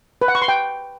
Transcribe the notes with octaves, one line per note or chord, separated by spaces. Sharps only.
B4
F#5
C#6
C6
G5